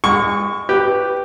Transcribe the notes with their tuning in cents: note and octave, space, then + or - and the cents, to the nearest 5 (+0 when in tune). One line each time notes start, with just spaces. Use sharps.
G#3 -35 C#6 +0
G4 +0 B4 +0